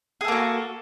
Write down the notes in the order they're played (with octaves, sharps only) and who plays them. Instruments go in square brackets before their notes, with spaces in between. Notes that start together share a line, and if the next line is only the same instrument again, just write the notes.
[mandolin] G#4
A4
A#3
F#4